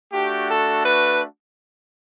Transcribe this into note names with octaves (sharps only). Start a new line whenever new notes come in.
A3 D4 F#4 G4
A4
B4